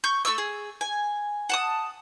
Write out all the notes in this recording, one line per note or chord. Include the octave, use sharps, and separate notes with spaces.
C#6 G6
A3 D#4 C#6 E6
G#4
G#5
F#5 A5 D#6